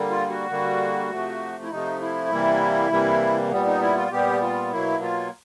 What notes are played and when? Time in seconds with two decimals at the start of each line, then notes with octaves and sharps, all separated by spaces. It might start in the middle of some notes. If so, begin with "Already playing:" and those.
Already playing: D3 G3 A#3
0.10 F4
0.30 F#4
0.50 D3 G3 A#3
1.10 C3 F3 A3
1.63 E4
1.70 C3 F3 A3 D#4
2.01 E4
2.32 C3 E3 G3 A#3
2.91 C3 E3 G3 A#3
3.51 A#2 G3 B3
3.67 D#4
3.82 E4
3.97 F4
4.11 A#2 G3 B3 G4
4.42 F4
4.72 B2 F#3 A#3 E4
5.03 F4